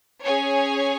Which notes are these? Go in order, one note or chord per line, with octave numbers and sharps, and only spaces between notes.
C#4 G#4 C#5 G#5